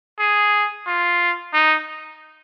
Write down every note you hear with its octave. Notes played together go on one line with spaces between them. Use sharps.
G#4
F4
D#4